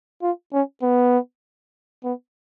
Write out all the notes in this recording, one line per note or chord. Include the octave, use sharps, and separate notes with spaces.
F4
C#4
B3
B3